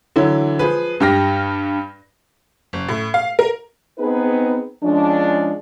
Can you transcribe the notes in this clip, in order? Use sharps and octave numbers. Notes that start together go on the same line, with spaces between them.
D3 E3 F#3 E4
F3 G#4 B4
G2 G4 F6 A#6
F#1
A2
F5
A#4
B3 C4 D#4 G#4 B4
F3 G#3 C#4 D4